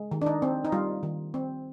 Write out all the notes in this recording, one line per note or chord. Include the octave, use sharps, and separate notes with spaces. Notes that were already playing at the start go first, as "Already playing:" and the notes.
Already playing: G#3
D#3
D4
D#4
C4
D#4
G3 F4
D#3
C4